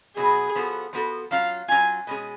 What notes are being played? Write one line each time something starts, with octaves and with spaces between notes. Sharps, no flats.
B2 F#3 B3 F#4 G#4
F3 B3 F#4 A4
F3 B3 F#4 A4
F#3 C#4 F4 F5
F#3 C#4 F4 G#5
B2 G#3 C#4 G#4